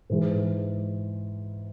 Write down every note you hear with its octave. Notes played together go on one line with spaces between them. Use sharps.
G#2 E3 G#3